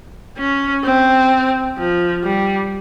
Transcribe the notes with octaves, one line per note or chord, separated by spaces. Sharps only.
C#4
C4
F3
G3